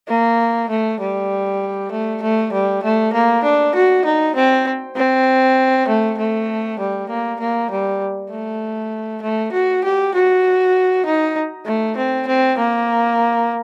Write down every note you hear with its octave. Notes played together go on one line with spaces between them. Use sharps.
A#3
A3
G3
A3
A3
G3
A3
A#3
D4
F#4
D#4
C4
C4
A3
A3
G3
A#3
A#3
G3
A3
A3
F#4
G4
F#4
D#4
A3
C4
C4
A#3